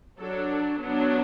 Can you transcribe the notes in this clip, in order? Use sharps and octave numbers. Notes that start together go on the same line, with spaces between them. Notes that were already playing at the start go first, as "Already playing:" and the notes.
F#3 D4 A4
F#3 B3 D4